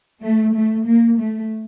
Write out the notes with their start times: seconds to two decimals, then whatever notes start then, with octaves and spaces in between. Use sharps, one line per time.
0.21 A3
0.53 A3
0.85 A#3
1.17 A3